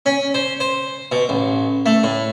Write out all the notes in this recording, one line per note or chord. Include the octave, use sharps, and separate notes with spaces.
C#4
C5
C5
B2
A1
A3
A2